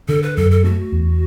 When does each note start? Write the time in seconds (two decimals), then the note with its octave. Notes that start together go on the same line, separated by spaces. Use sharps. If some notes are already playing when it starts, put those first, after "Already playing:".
0.08 D3 A4
0.22 B4
0.36 F#2 A4
0.51 A4
0.64 A3 F#4
0.92 E2